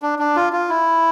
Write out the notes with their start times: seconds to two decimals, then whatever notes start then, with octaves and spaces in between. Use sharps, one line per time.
0.02 D4
0.19 D4
0.36 F4
0.53 F4
0.69 E4